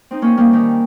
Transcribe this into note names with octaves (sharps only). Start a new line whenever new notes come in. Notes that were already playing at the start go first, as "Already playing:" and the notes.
C4 D#4
A#3 C#4
G3 A#3
D#3 G3